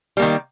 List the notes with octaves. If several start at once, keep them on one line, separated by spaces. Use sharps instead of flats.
D#3 G3 A#3